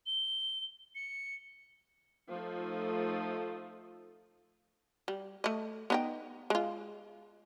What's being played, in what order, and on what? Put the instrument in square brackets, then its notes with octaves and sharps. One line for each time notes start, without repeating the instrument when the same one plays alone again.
[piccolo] G7
C#7
[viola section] F3 A3 D#4
[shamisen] G3
A3 D#5
B3 D#4 G5
G#3 F4